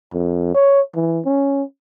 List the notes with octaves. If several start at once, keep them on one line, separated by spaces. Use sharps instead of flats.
F2
C#5
E3
C#4